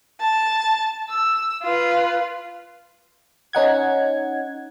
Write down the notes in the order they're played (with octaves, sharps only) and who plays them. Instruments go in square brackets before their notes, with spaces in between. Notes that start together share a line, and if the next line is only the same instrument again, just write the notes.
[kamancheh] A5
E6
F4 B4
[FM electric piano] C#4 D#4 F#5 G#6